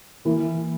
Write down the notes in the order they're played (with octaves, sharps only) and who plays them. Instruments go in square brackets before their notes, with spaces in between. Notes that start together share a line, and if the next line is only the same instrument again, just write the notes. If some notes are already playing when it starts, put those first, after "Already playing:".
[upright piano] E3 A#3 E4